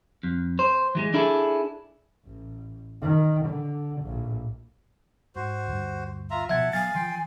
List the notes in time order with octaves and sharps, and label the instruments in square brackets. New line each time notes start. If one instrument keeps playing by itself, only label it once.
[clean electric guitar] F2
C5
E3 F#3 G#3
D4 E4 G#4 A4
[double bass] A1
D#3
D3
A#1 A2
[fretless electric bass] G#2 [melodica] F#4 C5
[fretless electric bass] D2 G2
[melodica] F4 E5 A#5
[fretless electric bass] B2 F3 [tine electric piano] E5 G#6 [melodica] F#5 A5
[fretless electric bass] F#3 B3 [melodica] F5 [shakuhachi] G#5 [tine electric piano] A6
[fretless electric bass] E3 F3 [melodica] G5 C6